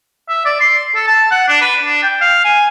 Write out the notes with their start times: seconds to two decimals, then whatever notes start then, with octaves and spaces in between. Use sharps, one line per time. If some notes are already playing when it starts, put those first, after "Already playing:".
0.29 E5
0.45 D5
0.61 C6
0.95 A4
1.07 A5
1.31 F#5
1.48 D4
1.61 B4
1.83 D4
2.03 G5
2.21 F5
2.45 G#5